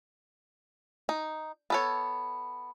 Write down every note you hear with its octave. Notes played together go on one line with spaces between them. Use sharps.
D#4
B3 A4 C#5